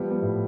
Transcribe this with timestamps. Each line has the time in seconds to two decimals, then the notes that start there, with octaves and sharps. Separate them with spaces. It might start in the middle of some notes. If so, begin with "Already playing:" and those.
Already playing: F3 G3 B3
0.10 G3 B3
0.22 A2